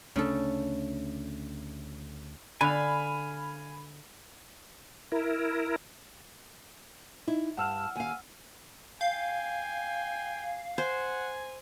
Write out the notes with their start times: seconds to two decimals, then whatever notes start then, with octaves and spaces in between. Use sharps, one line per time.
0.16 D2 C#3 A3 D4 A4
2.61 D3 F5 G#5 B5
5.12 E4 A#4
7.28 D#4 E4
7.57 G2 F#5 A5 E6 F6
7.96 D#2 F5 G#5
9.01 F5 G5 G#5
10.78 C5 F#5 G#5